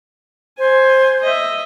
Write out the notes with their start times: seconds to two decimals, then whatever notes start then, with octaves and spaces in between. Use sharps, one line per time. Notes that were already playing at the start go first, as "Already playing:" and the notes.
0.58 C5 G#5
1.22 D#5 E5